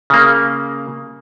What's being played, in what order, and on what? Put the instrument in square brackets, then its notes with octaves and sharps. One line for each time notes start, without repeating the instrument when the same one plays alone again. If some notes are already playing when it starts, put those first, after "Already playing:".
[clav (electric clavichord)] C#3 A#3